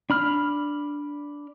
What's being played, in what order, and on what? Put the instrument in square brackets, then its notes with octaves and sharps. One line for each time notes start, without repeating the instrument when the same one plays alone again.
[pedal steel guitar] D4 B5 F6